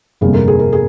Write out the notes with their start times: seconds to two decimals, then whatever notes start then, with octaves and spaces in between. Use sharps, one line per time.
0.21 G1 F2 C3 G3 A#3 G#4
0.34 A#4
0.48 G#4
0.59 A#4
0.73 G#4